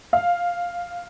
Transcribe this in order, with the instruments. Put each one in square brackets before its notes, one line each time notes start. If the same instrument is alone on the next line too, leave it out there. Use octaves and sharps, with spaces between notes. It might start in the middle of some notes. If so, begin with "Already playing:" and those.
[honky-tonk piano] F5